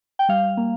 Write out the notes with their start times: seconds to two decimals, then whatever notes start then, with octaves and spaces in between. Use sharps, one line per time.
0.19 G5
0.29 G3 F5
0.57 A#3